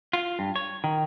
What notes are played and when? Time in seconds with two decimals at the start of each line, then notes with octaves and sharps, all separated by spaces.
0.13 F4
0.39 G2
0.56 C#5
0.84 D#3